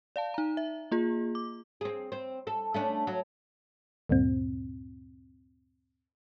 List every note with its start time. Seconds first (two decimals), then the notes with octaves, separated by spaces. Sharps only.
0.16 D5 F5 A5
0.34 D#4 A#5
0.57 E5
0.92 A#3 F4 G#4
1.35 D6
1.81 C4 G#4
2.12 C4
2.47 A4
2.74 A3 C#4 D4
3.07 F#3
4.09 D2 G2 A#2 C4